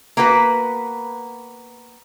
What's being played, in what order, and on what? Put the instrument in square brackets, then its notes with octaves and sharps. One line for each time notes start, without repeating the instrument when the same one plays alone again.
[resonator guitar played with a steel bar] A#3 B3 F#4 B4